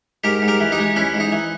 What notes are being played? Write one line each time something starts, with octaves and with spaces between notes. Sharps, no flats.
G#2 G4 A#4
G#2
G4 A#4
E3
D#4 G4
G#3
E3 C#4 E4
G#2
D#4
E3